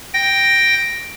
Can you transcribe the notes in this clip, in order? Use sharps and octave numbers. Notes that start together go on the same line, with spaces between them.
G5 A#6